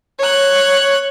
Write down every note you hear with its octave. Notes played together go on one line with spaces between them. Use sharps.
C#5 F#6